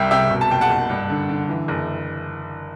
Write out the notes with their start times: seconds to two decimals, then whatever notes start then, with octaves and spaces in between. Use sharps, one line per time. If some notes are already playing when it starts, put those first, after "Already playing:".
Already playing: C2 G3 E5 G5
0.11 C3 E5 G5
0.30 B2
0.41 A5
0.50 F#1 G5
0.61 F#5 A5
0.69 F#1
0.89 G2
1.10 D3
1.29 D3
1.49 E3
1.68 F#1